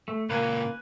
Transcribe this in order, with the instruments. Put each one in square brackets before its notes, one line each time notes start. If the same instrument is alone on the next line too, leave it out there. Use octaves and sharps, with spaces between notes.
[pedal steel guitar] A3
[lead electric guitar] C#2 A#2 [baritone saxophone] A#3 [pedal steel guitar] B4 G#5